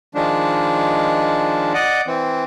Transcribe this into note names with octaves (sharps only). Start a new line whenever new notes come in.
D#3 F3 G#3 D4
D5 D#5 F#5
E3 C4